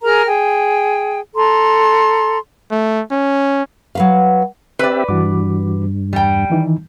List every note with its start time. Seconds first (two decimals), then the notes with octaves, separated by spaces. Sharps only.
0.03 G#4 A#4 A#5 F6
0.27 G#4 G5
1.34 A4 A#5 C6
2.71 A3
3.11 C#4
3.95 F#3 B4 F5
4.79 C4 G4 B4 D5 E5
5.09 G2 E3 F#4 D6
6.13 E2 G3 G5
6.50 D#3 E3 D#4